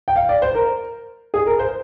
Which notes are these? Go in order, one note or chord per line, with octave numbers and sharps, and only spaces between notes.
G5
F5
D5
C5
A#4
G#4
A#4
C5